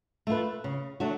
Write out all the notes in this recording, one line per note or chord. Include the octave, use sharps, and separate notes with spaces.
A3 F4 B4
C#3
F#3 A3 D4 F#4